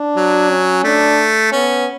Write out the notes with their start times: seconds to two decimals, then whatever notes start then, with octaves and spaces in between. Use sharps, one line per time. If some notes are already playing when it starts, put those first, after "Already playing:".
Already playing: D4
0.16 F#3
0.50 C#4
0.84 A3 D4
1.52 B3 C#4